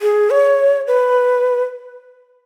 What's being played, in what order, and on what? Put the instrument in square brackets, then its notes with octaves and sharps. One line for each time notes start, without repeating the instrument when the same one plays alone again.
[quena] G#4
C#5
B4